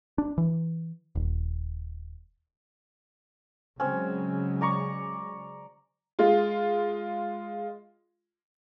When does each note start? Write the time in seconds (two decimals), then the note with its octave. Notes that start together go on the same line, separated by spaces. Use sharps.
0.18 D4
0.38 E3
1.15 D#1
3.80 C#3 F#3 G#3 C4 C#4
4.61 D5 A#5 C#6
6.19 G#3 F4